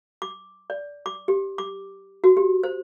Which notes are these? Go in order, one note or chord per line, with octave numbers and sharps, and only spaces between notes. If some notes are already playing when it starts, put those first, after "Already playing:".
D6
D5
D6
G4
D6
F#4
G4
C5